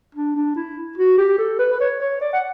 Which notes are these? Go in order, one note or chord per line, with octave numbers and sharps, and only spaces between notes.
D4
D4
E4
F#4
G4
A4
B4
B4
C#5
C#5
D5
F#5